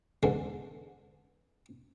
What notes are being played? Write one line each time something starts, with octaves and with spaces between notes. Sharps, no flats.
E2 G#2 D3 E3